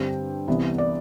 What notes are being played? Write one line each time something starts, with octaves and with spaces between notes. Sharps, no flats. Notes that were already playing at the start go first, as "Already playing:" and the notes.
Already playing: G2 D3 G3 C4 G5
C2 C3 E3 B3
D5